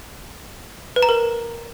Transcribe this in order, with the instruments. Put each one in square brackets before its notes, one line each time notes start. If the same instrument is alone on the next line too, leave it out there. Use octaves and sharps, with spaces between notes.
[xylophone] B4
A#5
A#4